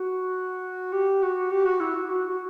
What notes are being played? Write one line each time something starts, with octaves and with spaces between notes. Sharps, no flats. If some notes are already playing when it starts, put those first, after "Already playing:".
Already playing: F#4
G4
F#4
G4
F#4
E4
F#4
F#4
F#4